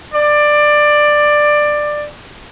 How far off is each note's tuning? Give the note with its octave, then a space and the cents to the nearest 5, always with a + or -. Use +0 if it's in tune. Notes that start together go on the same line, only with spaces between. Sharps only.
D5 +15